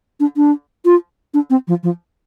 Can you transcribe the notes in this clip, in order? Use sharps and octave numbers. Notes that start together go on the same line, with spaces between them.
D4
D4
F4
D4
C4
F3
F3